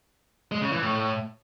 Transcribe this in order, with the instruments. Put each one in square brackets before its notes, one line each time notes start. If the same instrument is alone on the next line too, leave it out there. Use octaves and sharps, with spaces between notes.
[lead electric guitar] G#3
C#3
E3
A2